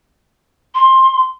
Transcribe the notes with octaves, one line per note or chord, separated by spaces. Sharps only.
C6